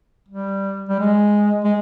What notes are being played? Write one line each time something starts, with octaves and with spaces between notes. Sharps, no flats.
G3
G3
G#3
G#3